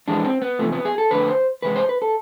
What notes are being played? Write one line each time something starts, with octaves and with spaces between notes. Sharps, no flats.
F2 E3 G#3 D4
C4
B3
E2 C3 F3 A3
B3
G#4
A4
F2 D3 A3 B4
C5
E2 C3 G#3 B4
C5
B4
A4